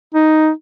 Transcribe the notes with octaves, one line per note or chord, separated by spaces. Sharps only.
D#4